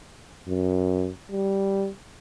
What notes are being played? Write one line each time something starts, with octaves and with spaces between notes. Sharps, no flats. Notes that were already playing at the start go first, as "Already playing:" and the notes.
F#2
G3